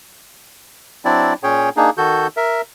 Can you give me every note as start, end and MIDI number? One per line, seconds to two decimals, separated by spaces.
1.05 1.34 54
1.05 1.34 60
1.05 1.34 62
1.05 1.34 64
1.05 1.34 74
1.43 1.69 46
1.43 1.69 61
1.43 1.69 68
1.43 1.69 73
1.43 1.69 79
1.77 1.90 58
1.77 1.90 62
1.77 1.90 63
1.77 1.90 68
1.98 2.27 51
1.98 2.27 66
1.98 2.27 69
1.98 2.27 91
2.37 2.61 70
2.37 2.61 76